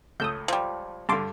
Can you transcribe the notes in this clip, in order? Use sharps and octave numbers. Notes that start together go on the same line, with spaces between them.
C#2 A3 D#6 E6 G6
F3 G3
G2 D3 A5 C6 D6